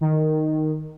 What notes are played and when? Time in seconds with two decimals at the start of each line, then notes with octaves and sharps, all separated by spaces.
0.01 D#3